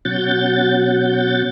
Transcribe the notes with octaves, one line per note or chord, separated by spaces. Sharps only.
B2 F#3 C#4 F#5 G6 A6